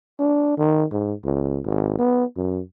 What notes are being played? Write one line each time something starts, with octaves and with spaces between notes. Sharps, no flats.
D4
D#3
G#2
C#2
G#1
B3
F#2